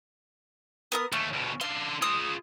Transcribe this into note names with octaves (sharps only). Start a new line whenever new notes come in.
B3 A#4 D#6
D#2 A3 C#4
D2 B2
D3 F5 C6
F4 G#4 D#6 F#6